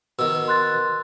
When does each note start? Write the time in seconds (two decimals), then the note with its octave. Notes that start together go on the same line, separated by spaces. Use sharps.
0.19 B2 D#3 E6
0.48 C6 F#6 A6